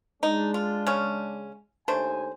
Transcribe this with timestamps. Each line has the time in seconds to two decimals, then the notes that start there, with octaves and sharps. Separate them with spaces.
0.23 G#3 D4 D#4
0.54 F4
0.87 C#3 C#4
1.88 D#2 A3 D4 C5 G#5